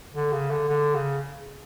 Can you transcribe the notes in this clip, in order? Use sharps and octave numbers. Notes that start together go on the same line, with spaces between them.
D3
C#3
D3
D3
C#3